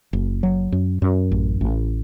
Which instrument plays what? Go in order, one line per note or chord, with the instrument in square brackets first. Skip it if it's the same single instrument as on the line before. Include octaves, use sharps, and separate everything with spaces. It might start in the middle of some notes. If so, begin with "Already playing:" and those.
[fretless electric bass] F#1
F#3
F#2
F#2
A1
A1